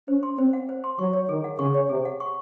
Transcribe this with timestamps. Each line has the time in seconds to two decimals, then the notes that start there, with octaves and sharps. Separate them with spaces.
0.08 C#4 C5
0.23 C6
0.38 C4 C5
0.53 F#5
0.69 C5
0.84 C6
0.98 F#3 C#6
1.13 C#5
1.29 D#3 G#4
1.44 F#5
1.59 C#3 C#6
1.74 C#5
1.89 C3 G#4
2.05 F#5
2.20 C#6